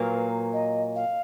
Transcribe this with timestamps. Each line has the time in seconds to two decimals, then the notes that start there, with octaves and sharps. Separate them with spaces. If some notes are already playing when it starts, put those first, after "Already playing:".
Already playing: A#2 F#3 A#3 B4
0.53 D#5
0.95 F5